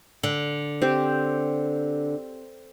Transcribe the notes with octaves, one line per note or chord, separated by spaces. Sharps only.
D3
C4 G4